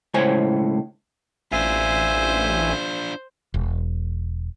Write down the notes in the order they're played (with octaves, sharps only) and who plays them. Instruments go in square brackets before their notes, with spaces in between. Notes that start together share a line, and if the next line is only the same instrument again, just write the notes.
[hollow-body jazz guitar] C#2 A2 C5 C#5 G#5
[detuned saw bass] A1 [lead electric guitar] D4 F4 [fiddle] C5 [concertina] E5 G#5
[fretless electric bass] E1